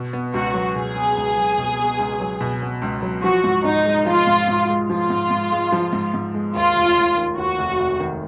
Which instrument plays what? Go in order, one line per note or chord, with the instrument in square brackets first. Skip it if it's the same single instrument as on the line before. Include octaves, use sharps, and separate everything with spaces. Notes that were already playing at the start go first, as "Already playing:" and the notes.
Already playing: [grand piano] B2
B3
[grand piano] C#2 [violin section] F#4
[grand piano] F#3
[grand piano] B2 [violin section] G#4
[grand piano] B3
C#2
F#3
B2
B3
C#2
F#3
B2
B3
C#2
F#3
[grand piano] F3 [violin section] F#4
[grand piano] G#2
[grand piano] G#2 [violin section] D#4
[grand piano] G#3
[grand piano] F3 [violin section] F4
[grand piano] G#2
G#2
G#3
[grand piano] F3 [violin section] F4
[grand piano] G#2
G#2
G#3
F3
G#2
G#2
G#3
[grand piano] D#2 [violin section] F4
[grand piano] F1
F1
D#3
[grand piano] D#2 [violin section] F#4
[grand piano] F1
F1
D#3